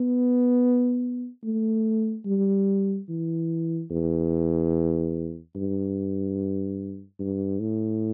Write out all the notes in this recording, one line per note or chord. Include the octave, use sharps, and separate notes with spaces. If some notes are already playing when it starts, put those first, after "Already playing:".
Already playing: B3
A3
G3
E3
E2
G2
G2
A2